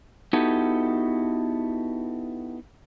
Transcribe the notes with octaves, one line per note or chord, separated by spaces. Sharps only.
B3 D#4 E4 F#4 G4 A4